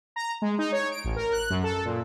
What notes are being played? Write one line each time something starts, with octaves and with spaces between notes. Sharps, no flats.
A#5
G#3
D#4
C#5
D7
A1
A#4
F#6
F#2
A4
A#2